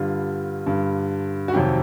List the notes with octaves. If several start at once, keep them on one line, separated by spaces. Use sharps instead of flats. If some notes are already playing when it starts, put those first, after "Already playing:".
Already playing: G2 D3 G3 F4
G2 D3 G3
F#4
F2 C3 D#3 F#3 G4